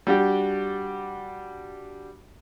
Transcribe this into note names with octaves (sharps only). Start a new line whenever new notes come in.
G3 D4 F#4 G4